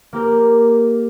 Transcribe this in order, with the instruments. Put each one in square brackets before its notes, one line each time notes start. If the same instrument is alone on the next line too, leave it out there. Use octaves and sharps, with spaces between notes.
[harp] A#3 G4 A#4